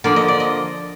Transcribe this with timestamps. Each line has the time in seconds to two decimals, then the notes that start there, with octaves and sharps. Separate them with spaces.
0.04 D3 F3 A#3 D5
0.16 D#5
0.28 D5
0.40 D#5